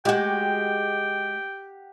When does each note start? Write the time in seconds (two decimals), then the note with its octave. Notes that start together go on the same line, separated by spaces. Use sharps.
0.05 G#3 F#4 G4 F#5 G5